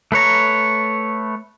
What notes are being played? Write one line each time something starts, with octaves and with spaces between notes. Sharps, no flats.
A3 B4 C#5 A#5